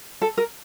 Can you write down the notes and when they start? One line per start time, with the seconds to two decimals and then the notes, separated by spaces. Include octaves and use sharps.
0.22 A4
0.38 A#4